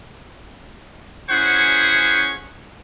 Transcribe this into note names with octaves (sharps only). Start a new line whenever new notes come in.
C#4 E4 G#4 C5 F#5 C#6